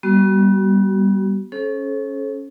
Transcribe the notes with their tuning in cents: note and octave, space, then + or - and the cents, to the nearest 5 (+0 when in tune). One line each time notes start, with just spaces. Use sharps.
G3 +0 B3 -35 F#4 +30
C#4 +0 A4 -35 C5 +40